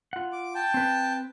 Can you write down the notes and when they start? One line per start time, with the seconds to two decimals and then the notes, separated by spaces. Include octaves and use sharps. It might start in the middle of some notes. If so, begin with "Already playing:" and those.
0.13 F4 F#5
0.32 D6
0.55 G5 A5
0.74 C4 B4